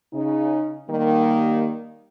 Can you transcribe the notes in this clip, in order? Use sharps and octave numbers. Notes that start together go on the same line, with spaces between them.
C#3 D#4
D#3 G3 A#3